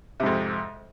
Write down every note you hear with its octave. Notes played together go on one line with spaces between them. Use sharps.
F2 G#2 C3